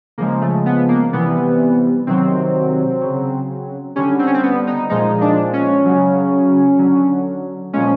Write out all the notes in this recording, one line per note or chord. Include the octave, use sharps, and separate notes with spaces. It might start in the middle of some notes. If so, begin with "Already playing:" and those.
C#3 F3 G#3 A#3
A3
B3
A#3
C3 E3 G3 B3
C3 D#3 F#3 C4
C#3 F#3
D3 G3 C#4
C4
C#4
C4
B3
D#4
A#2 F3 G#3 D#4
D4
C#4
C#3 F#3
D3 F#3
A#2 F3 G#3 C#4